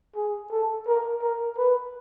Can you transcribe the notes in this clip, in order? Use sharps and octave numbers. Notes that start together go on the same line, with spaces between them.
G#4
A4
A#4
A#4
B4